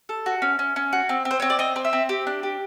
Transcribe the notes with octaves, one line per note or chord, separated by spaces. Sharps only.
A4
F#4
C#4
C#4
C#4
F#4
C4
C4
C5
C4 C#5
D5
C4 D#5
C4
E5
C4
G4
D4
G4